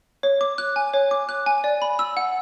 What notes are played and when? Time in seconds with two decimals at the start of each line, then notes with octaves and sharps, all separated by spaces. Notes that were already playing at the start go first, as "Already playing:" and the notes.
0.23 C#5
0.41 D6
0.58 F#6
0.76 G#5
0.94 C#5
1.11 D6
1.29 F#6
1.46 G#5
1.64 D5
1.82 B5
1.99 E6
2.17 F#5